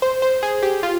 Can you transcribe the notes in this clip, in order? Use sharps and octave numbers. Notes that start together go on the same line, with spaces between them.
C5
C5
G#4
G4
F4